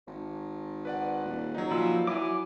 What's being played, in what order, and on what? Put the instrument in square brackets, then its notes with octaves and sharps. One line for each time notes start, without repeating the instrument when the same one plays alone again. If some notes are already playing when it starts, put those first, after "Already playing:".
[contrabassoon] G#1
[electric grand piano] B4 D5 F#5
[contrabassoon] D#1
[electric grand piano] F#3 D#4
[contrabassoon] A#2 [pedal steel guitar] F3 B4 E6
[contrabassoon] F#3 [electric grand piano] E4 [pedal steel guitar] G#5 D6